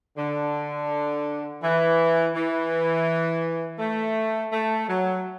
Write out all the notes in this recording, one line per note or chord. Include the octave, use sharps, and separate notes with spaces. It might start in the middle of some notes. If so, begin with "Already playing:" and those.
D3
E3
E3
A3
A3
F#3